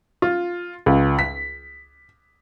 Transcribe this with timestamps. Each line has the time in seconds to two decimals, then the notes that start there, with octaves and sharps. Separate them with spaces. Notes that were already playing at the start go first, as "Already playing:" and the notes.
0.22 F4
0.86 C#2
1.19 B6